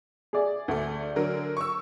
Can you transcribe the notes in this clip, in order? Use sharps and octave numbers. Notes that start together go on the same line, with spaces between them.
G#4 D5 E5
D2 A3
D3 F#3 A#4
C#6 E6